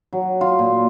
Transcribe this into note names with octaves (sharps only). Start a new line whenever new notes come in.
F#3
F4
A#2